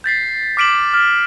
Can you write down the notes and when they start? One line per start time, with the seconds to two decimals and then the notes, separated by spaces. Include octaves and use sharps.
0.04 G6 A6 B6 C7
0.57 D6 F6 B6 D7 E7 F#7
0.94 F6